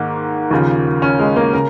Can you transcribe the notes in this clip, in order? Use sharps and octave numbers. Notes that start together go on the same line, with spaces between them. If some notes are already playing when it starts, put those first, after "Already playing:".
Already playing: G#2 D#3 A#3
D#2 C#3 F3
C#4
G#3
A#3
C#3 A#4